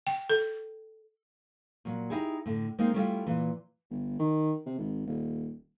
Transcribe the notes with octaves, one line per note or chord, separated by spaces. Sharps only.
G5
A4
A#2 F#3
D#4 E4 G4 G#4
A2 D3
G#3 A#3 C4 D#4
G3 A3 B3 C#4 E4 F4
A#2 E3
G1
D#3
C3
G#1
D#1